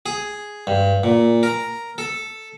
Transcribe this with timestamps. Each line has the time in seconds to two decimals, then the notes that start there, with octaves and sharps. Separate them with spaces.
0.06 G#4
0.67 G2
1.04 A#2
1.43 A#4
1.98 A4